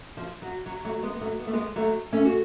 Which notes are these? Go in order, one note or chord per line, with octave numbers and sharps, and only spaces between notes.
F3
F#3
F#3
F#3 A3
G#3 B3
B3
F#3 A3
B3
A3
G#3 B3
F#3 A3
A3 C#4
F#4